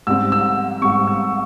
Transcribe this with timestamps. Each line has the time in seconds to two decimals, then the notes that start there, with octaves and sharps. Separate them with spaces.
0.07 G#2 G3 C4 E6
0.32 E6
0.81 G#2 G3 C4 C#6
1.07 E6